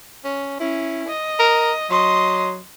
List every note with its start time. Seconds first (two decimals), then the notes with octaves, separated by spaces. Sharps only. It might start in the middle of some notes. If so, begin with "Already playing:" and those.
0.24 C#4
0.60 C#4 E4
1.08 D#5
1.39 A#4
1.90 F#3 D#5 C6